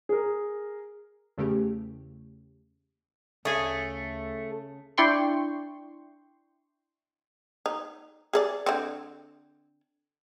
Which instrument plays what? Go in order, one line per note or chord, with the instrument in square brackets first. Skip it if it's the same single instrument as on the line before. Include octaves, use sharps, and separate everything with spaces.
[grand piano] G#4 A#4
[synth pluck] E2 C#3 A3 C#4 G4
[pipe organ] D2 [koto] C#3 G#4 G#5 [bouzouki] A3
[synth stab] D4 E4 D5 G5 C6 C#6
[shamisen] D#4
G#4 A4 D5
D3 C4